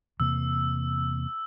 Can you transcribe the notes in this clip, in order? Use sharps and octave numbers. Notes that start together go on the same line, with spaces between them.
E2 C3 A#3 E6